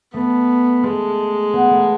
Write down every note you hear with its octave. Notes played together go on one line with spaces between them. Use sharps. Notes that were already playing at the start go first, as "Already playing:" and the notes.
A3 B3
G#3 A3
B3
A3